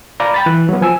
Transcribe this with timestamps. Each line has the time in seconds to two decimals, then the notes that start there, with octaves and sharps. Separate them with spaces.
0.20 D5 F5 A#5 B5
0.34 G5 B5 A6
0.46 E3 F#6
0.69 F#3 B3
0.81 F3 G#5 E6